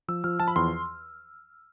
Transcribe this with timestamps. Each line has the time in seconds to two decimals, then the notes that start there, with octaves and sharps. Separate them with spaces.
0.08 F3 E6
0.24 F3 F6
0.40 F3 A5
0.48 B5
0.56 E2 C6